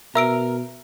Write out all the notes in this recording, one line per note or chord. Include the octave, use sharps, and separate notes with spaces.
B2 A#4 E5 E6 D7